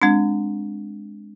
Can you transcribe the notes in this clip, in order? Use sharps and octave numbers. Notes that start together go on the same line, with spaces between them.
G#3 C4 D4